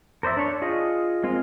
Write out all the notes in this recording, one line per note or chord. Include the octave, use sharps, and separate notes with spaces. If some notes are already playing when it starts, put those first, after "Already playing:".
A#4 C5 D5 E5
D4 C#5 C#6
F4 G#4 D#5
G#3 C4 F4 A#4